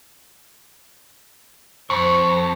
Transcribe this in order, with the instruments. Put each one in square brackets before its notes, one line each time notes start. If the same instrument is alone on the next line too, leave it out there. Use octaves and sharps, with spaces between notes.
[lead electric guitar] F2 [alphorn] C5 [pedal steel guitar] C#6